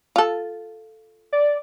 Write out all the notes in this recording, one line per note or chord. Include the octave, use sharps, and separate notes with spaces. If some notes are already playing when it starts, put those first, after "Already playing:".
F4 A4
D5